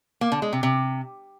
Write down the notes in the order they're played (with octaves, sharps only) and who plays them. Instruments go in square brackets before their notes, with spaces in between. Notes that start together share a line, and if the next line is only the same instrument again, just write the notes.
[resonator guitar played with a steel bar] A#3
D3
G#3
C3
C3